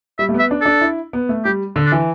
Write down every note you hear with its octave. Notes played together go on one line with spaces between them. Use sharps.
G3 E5
A3
B3 E5
D4
D4 A4
E4
B3
A3
G3 G4
D3
D4
E3